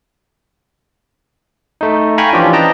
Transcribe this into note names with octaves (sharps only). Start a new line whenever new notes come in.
A3 D#4
F5 G5 G#5 A#5 B5 C#6
E3 F3 C#4 D4 F4 G4
B4 D#5 G5 A5 A#5